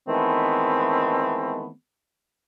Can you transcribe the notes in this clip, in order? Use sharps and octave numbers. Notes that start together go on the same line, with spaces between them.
D#3 E3 G#3 A3 B3 C4